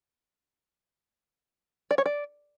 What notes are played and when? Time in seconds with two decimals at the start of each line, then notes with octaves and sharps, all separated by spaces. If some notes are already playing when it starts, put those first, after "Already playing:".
1.91 D5
1.98 C#5
2.06 D5